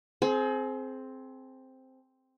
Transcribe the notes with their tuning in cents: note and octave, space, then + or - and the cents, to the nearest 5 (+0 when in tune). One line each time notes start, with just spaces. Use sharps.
C4 +0 G#4 +35